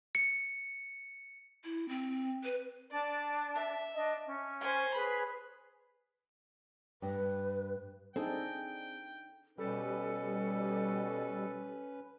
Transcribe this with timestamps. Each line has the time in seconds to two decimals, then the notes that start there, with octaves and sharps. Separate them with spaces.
0.15 C#7
1.64 E4
1.89 C4
2.44 B4
2.91 D4 D5
3.56 E5
3.93 D4 D#5
4.23 C#4
4.61 C5 G#5
4.94 G#4 B4 C#5 B5
7.02 G2 B4
8.16 C4 D4 D#4 G#4 A4 G5
9.58 B2 G3 C#4 A4 B4